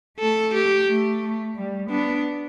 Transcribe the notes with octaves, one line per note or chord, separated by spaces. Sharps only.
A3 A4
G4
A3
G3
B3 D4